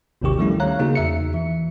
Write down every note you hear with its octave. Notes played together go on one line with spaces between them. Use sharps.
G#1 D#2 C3 D#3 G4 C#6
D#3 F3 G3 A3 C#4 E4
C#5 F5 A#5 F#6
C#3 A#3 D#4 F#4 G#4
E2 E5 C#7
E3